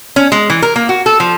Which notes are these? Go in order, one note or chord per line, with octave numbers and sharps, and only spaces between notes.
C#4
G#3
E3
A#4
A#3
F#4
A4
F3